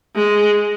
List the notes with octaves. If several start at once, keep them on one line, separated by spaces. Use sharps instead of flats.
G#3